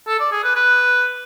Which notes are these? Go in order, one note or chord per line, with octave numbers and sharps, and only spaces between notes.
A4
D5
G#4
B4
B4